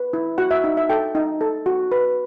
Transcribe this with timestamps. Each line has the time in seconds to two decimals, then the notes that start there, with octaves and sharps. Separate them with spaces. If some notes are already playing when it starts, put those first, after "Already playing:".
Already playing: B4
0.13 E4
0.38 F#4 F#5
0.51 E5
0.64 D#4
0.77 E5
0.89 A4 G5
1.15 D#4
1.41 A4
1.66 F#4
1.92 B4